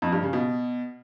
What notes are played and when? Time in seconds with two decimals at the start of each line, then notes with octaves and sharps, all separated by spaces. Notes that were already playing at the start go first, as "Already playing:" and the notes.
0.02 F2
0.12 G2
0.23 C#3
0.33 B2